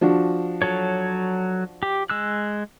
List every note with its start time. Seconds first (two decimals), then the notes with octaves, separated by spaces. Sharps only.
0.01 F3 D4 F#4
0.62 F#3 A4 C#5
1.83 G4
2.10 G#3 E6 F#6